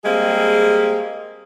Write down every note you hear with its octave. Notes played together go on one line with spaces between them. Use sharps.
G3 G#3 A#3 C4 G#4